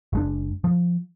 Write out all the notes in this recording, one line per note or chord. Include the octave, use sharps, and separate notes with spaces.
F#1 G#3 D4
F3